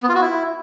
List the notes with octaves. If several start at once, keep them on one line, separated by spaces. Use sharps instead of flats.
B3
F4
F#4
E4